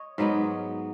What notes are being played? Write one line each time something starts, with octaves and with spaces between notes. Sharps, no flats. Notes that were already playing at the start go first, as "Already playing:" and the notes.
Already playing: C#5 D#5
G#2 F#3 B3 D#4